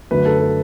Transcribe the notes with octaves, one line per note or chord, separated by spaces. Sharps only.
F#2 D3 F#3 A3 B4
A4
B4